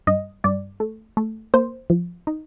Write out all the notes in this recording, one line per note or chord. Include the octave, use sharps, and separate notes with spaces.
G2 D#5
G2 D5
A3
A3
A#3 C5
F3
D#4